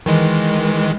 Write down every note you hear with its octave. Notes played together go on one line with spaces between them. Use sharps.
D#3 E3 G#3